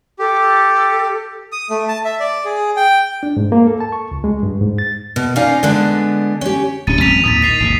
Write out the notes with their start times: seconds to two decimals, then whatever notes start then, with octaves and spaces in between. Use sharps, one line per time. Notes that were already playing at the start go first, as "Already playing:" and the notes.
0.19 G4 A4
1.52 D#6
1.70 A3
1.88 A5
2.05 E5
2.20 D5
2.45 G#4
2.76 G5
3.23 D4
3.37 G#2
3.52 A#3
3.67 A4
3.80 A5
3.92 C#6
4.11 C#2
4.24 G#3
4.43 G2
4.61 G#2
4.78 A6
5.16 B2
5.36 C#4 D#4 F4 D5 F5
5.63 D3 G#3 B3 D4
6.41 C#4 G4
6.87 D1 C#4 A6 D#7
7.01 G#1 F#2 C4 B6 D#7 F7
7.24 A#1 D#2 A2 D#6 A6
7.42 D#3 A6 C7 F7
7.60 G#1 D#2 C3